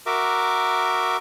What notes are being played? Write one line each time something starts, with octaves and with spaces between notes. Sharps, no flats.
F#4 A#4 E5 D6